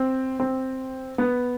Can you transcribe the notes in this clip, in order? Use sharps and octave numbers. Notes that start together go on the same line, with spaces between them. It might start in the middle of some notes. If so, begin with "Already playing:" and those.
Already playing: C4
C4
B3